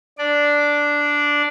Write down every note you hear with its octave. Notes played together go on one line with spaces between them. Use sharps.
D4 D5